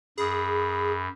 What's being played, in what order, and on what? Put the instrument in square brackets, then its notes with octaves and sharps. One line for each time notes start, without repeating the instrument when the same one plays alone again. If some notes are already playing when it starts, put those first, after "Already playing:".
[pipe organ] F#2 [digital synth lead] G#4 [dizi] B5